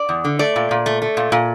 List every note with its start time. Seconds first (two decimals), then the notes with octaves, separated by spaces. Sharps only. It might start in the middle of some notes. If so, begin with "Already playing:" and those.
Already playing: D5
0.09 E2
0.25 D3
0.39 A3 D5
0.56 A#2
0.71 A#2
0.86 A3
1.02 A3
1.17 A#2
1.32 A#2